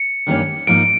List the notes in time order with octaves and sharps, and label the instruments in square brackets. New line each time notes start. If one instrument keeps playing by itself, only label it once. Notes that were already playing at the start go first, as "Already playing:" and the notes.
Already playing: [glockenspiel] C#7
[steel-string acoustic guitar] G2 D#3 G3 A#3 C#4
[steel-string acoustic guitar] G#2 F3 A#3 D#4 [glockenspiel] D7